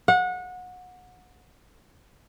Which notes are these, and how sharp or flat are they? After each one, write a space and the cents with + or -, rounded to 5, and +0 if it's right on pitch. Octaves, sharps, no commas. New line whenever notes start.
F#5 -25